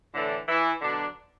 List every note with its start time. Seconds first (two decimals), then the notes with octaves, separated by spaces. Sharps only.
0.13 A2 D3 E3 D4
0.48 E3 E4
0.82 B2 D3 F#3 D4